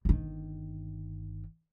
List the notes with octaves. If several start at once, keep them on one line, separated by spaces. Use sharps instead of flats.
G1 D#3